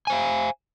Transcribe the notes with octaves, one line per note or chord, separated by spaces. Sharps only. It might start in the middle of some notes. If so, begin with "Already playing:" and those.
C5 F5 G#5